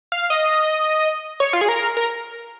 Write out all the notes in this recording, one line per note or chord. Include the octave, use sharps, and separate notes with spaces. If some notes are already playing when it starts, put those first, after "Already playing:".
F5
D#5
C#5
F4
G#4
A#4
A#4